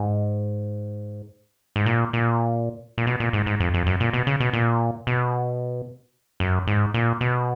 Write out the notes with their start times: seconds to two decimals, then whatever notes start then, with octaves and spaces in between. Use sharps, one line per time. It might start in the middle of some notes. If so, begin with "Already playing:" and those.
Already playing: G#2
1.76 G#2
1.86 A#2
2.13 A#2
2.98 A#2
3.07 B2
3.20 A#2
3.33 G#2
3.46 G#2
3.60 F2
3.74 F2
3.86 F#2
4.00 A#2
4.13 B2
4.27 C#3
4.40 B2
4.53 A#2
5.07 B2
6.40 F#2
6.67 G#2
6.94 A#2
7.21 B2